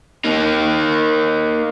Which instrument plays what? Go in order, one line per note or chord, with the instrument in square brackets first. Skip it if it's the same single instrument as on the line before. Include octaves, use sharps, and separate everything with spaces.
[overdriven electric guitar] A#3 D#4